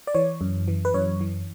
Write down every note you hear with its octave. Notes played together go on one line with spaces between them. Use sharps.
D5
E3 C#5
F#2
E3
B4
F#2 C#5
E3